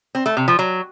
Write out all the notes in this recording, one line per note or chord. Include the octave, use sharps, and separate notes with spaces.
C4
A3
C3
F3
F#3